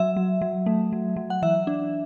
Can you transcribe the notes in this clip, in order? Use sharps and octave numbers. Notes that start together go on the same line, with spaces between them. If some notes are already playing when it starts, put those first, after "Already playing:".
Already playing: F#3 E5
F#3
F#3
A3
F#3
F#3
F#5
E3 E5
D4